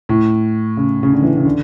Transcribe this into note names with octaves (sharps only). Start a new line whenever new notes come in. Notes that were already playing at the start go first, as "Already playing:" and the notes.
A2
C#3
C#3
D3
E3
C#3
D3